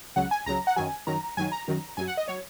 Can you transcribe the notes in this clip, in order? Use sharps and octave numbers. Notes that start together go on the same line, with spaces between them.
C#2 C#3 F#3 F#5
G#5
C#2 C#3 F#3 A#5
F#5
F#2 D#3 F#3 G#5
F#2 D#3 F#3 A#5
F#2 D#3 F#3 G#5
A#5
F#2 D#3 F#3
F#2 F#3 G#5
F#5
D#5
F#3 C#5